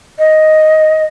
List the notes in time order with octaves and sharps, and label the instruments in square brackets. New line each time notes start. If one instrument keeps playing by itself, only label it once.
[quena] D#5